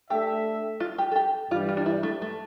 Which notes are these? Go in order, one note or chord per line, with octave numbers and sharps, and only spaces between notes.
A3 D4 G4 A4 E5
F4
G4
A4
G4
G2 E3 G3 F4
F4
D4
E4
A3
A3